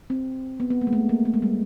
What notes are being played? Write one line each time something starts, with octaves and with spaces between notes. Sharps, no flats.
C4
B3
B3
A#3
G#3
A3
A#3
A3
G#3
G3